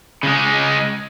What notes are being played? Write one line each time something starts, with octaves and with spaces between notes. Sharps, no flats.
C#3 G#3